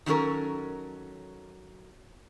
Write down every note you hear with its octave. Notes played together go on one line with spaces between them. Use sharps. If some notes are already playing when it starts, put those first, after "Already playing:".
D#3 F#3 C#4 A4 A#4